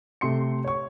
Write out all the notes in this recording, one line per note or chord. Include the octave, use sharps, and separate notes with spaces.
C3 A3 C6 C#7
C#5 C#6